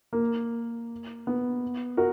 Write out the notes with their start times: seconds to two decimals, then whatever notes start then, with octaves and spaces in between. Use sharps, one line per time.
0.13 A#3
1.27 B3
1.97 F#4 A#4